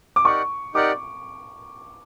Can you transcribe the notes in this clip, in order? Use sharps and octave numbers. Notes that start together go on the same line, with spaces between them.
D6
D#4 G4 A#4 D5 F#5 C#6
D#4 G4 A#4 D5 F#5 D6